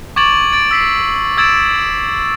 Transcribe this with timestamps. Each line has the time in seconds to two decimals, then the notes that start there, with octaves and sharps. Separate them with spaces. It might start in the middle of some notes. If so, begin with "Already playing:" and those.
0.16 C#6 D6 G#6 A6 D7 F#7
0.52 A6 D7
0.71 E6 B6 C7
1.37 D#6 E6 G#6 A6 D7 E7